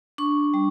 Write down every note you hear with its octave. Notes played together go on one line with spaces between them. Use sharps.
D4 C#6
G3